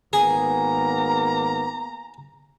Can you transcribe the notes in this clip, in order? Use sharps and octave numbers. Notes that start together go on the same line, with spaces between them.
G#1 A#3 B3 G#4 A#5